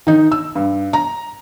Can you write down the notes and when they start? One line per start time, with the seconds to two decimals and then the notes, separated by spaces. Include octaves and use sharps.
0.07 D#3 D#4
0.32 E6
0.55 G2
0.93 A#5